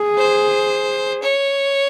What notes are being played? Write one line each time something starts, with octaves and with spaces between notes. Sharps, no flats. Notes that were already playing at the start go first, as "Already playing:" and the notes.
Already playing: G#4
C5
C#5